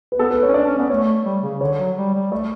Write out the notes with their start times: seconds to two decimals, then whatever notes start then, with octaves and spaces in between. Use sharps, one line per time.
0.12 B4
0.19 B3 A4
0.31 B4
0.43 C#5
0.48 C#4
0.54 D4 D5
0.66 C#4
0.78 B3 D5
0.90 A3 C#5
1.25 G3
1.43 C#3
1.61 D3 C#5
1.79 F#3
1.97 G3
2.14 G3
2.31 A3 D5